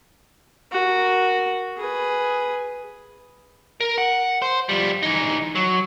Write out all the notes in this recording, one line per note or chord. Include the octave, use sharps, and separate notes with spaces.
F#4 A#4
G#4 B4
A#4
F#5
C5
F3 G3
E3 D#4
F#3